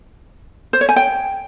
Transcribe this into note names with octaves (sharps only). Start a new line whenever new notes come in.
C5
C#5
G#5
G5